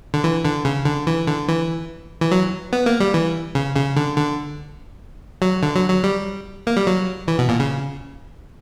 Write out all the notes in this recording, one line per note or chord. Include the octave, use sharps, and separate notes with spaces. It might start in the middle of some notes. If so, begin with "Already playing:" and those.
D3
E3
D3
C#3
D3
E3
D3
E3
E3
F#3
B3
A#3
G3
E3
C#3
C#3
D3
D3
F#3
D3
F#3
F#3
G3
A#3
G3
F#3
E3
B2
A#2
C#3